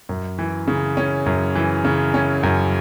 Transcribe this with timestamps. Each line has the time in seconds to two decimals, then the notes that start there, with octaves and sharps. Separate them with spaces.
0.09 F#2
0.39 E3
0.68 C#3
0.97 C#4
1.26 F#2
1.55 E3
1.85 C#3
2.14 C#4
2.43 F#2